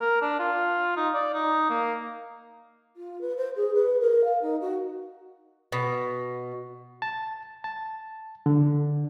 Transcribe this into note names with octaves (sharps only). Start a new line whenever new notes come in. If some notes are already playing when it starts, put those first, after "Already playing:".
A#4
D4
F4
D#4
D5
D#4
A#3
F4
B4
C5
G#4
B4
A#4
F5
D#4
F#4
B2
A5
A5
D3